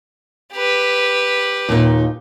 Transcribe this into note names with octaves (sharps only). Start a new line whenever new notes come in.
G4 B4
D#2 A#2 D#4